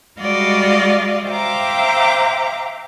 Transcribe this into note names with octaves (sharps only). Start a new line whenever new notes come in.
G3 G#3 F#4 D5 D#5 F5
C5 E5 F5 G5 A#5 D6